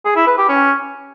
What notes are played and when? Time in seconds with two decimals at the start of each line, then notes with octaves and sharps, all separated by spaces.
0.05 G#4
0.16 E4
0.27 B4
0.38 G4
0.49 C#4